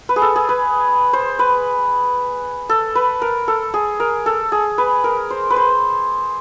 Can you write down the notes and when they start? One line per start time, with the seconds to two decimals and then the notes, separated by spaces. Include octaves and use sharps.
0.09 B4
0.16 G#4
0.22 A4
0.36 G#4
0.49 B4
1.13 C5
1.39 B4
2.69 A4
2.95 B4
3.22 A#4
3.48 A4
3.74 G#4
4.00 A#4
4.26 A4
4.52 G#4
4.78 B4
5.04 A#4
5.31 C5
5.50 B4
5.56 C5